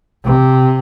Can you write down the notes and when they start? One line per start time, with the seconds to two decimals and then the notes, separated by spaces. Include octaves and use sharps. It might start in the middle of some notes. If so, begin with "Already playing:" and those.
0.24 C3